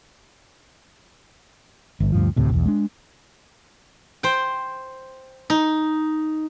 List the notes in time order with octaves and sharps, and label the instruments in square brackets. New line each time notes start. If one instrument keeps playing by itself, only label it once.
[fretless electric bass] G1
D2 G2 F3
D2 A2 C3
B1 E2
G#3 D4
[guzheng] C5 G5
D#4